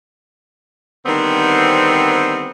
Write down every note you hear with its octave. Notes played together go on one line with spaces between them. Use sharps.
D3 D#3 G3 B3 C4